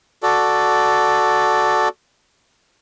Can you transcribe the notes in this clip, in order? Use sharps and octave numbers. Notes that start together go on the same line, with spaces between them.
F#4 A4 D5